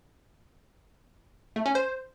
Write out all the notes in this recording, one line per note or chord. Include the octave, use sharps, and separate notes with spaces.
A3
C#4
C5